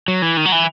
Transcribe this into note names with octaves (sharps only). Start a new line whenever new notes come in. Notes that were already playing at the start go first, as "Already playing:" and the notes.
F#3
E3
D#3
F#3
E3